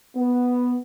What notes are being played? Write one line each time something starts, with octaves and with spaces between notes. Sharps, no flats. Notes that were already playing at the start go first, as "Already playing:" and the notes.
B3